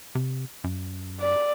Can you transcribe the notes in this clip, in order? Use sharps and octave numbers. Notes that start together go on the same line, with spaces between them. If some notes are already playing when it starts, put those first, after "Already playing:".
C3
F#2
D5